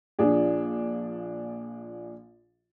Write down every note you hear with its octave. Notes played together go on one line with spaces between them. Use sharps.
A#1 F3 D4 G#4